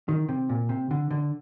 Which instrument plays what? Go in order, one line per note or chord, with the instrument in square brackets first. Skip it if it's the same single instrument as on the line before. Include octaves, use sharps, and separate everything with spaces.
[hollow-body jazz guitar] D#3
C3
A#2
C3
D3
D3